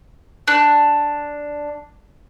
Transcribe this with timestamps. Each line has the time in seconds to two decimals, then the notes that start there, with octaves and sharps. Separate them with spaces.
0.48 D4 F#6